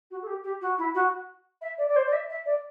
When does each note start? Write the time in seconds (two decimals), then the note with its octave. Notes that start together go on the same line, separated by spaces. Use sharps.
0.10 F#4
0.22 A4
0.26 G4
0.43 G4
0.61 F#4
0.77 E4
0.94 F#4
1.61 E5
1.77 D5
1.88 D5
1.95 C5
2.05 D5
2.12 E5
2.29 E5
2.45 D5